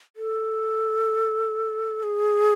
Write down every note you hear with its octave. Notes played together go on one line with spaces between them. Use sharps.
A4
G#4